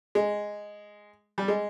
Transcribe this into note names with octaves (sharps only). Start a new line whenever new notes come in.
G#3
G3
G#3